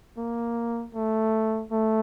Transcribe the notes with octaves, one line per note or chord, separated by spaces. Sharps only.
A#3
A3
A3